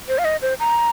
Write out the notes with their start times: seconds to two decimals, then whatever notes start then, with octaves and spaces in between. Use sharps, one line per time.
0.08 C5
0.18 F5
0.25 D#5
0.42 C5
0.59 A#5